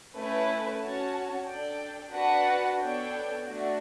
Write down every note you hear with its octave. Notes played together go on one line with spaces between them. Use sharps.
A3 C#4 E4 B4
C#4 F#4 C#5 F#5 A5
D4 A4 D5 G5
D4 F#4 B4 F#5 A5
B3 D4 A4 C#5 G5
A3 D4 F#4